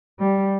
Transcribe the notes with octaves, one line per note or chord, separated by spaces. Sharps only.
G3